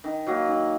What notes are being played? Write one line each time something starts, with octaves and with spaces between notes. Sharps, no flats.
D#3
F#3 A#3
D#3